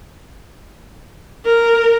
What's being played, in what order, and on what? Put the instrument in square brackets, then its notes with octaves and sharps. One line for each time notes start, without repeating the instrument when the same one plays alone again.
[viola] A#4